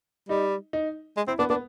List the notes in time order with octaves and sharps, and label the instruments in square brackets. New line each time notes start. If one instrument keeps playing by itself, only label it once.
[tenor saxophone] G3 [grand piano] D#4
[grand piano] D#4
[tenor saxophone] G#3
[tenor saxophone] C4 [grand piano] E4
[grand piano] B3 [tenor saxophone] D4
[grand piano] B3 [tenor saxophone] D4